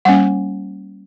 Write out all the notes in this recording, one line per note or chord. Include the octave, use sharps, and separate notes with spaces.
G3 A#3 C#4 F#5